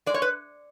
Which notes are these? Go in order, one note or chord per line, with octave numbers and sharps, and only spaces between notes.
G#3 D5
C#5
B4